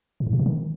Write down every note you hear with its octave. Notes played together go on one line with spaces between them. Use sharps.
A2
G#2
A#2
B2
D#3